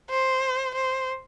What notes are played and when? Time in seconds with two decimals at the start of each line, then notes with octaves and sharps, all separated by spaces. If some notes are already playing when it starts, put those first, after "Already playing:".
0.10 C5
0.75 C5